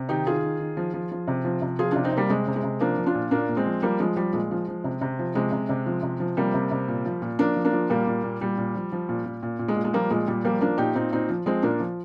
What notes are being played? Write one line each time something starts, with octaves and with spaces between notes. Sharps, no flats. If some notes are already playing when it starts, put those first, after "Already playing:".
Already playing: C3
D#3 D#4 G4
D#3 F4 G#4
D#3
D#3
F3
F3
F3
C3
F3
C3
F3 F4 G#4
C3 D4 F4
C4 D#4
C3 G3 A#3
C3 G#3
C3
G#3
C3
F3 A#3 D4
F3
D4 F4
A#2
A#2 A#3 D4
A#2
G#3 C4
F3
F3 G3 A#3
F3 G#3
F3 G3
A#2 G#3
F3
F3
C3
C3
F3
C3 G#3
C3
C3
F3
C3
F3
C3 G3 A#3
C3
C3
A#2
F3
A#2
F3 A#3 D4
F3
A#3 D4
F3
A#2 G3 A#3
A#2
A#2
A#2 G3
A#2
F3
F3
A#2
A#2
A#2
A#2
G#3
A#2
G#3
F3 G3 A#3
A#2 G#3
A#2 G3
F3 G3 A#3
F3 A#3 D4
A#2 D#4 G4
A#2 C4 D#4
A#2 C4 D#4
F3
F3 G#3 C4
A#2 A#3 D4
F3